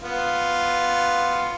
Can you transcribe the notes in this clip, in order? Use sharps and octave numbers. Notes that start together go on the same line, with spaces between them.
B3 F4